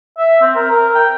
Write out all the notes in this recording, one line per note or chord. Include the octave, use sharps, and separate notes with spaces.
E5
C4
A#4
A#4
G5